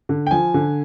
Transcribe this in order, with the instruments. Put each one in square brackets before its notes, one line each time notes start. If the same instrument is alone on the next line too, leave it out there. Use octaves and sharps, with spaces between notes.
[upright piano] D3
G5
F3 G#5
D3